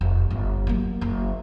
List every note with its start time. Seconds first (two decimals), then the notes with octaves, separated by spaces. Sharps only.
0.01 F1
0.30 G1
0.67 F#3 A#3
1.01 F#1 A#3